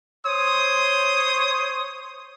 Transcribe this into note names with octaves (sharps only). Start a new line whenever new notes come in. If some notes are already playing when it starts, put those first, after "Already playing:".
C5 C#5 C6 D#6